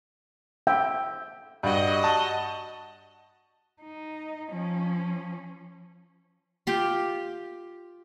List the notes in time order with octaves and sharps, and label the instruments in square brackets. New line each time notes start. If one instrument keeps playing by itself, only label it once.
[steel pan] E5 G5
[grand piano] G2 [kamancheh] F#4 D#5
[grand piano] A5
[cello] D#4
F3 C#4
[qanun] F4 G4 G5